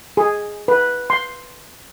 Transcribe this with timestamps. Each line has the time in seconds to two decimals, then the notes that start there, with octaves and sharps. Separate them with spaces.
0.17 G#4
0.68 B4
1.10 C6